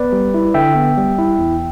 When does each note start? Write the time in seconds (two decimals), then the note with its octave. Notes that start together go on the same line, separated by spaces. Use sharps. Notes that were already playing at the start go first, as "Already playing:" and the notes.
Already playing: B3 B4 D5
0.12 G3
0.34 E4
0.54 D3 E5 G5
0.75 B3
0.97 G3
1.18 E4
1.39 E2